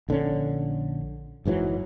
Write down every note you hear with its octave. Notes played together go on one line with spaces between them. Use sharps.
A#1 D3 C4 C#4
F#1 G#2 E3 F#3